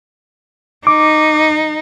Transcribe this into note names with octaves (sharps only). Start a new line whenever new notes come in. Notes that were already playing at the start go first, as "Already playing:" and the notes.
D#4 D6